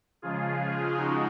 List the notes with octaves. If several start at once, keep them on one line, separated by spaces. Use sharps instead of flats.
C#3 F3 G#3 F4 G#4
C#3 F3 G#3 D#4 F#4